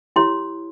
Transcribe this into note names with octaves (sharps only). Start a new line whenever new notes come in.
E4 G4 C#5 C6